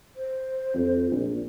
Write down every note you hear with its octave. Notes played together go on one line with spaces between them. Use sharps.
C5
F2
A#1